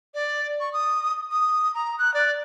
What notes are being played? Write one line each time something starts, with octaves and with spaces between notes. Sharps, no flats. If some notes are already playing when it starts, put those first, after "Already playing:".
D5
C#6
D#6
D#6
A#5
F#6
D5